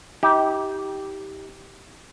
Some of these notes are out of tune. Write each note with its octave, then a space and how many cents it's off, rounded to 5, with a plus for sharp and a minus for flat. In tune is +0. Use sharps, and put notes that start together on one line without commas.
D#4 +40 G4 -10